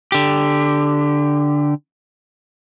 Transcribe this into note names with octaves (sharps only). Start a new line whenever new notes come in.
D3 G4